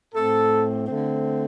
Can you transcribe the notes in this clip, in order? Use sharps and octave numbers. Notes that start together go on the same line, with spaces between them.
A2 A3 C4 A4
D3 A3 C4